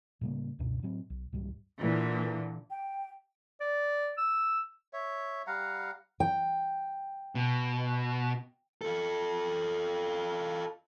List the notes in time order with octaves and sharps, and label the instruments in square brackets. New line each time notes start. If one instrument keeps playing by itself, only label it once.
[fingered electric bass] A2 C#3 G3 A#3
C#2 F#2 B2 D4
A2 F#3 C4
B1
C2 G#2 G3
[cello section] A#2 D3 E3
[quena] G5
[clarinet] D5
E6
[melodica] C#5 E5
G3 F5 F#5 A#5
[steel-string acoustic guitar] G5
[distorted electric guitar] B2
[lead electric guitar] F4 A4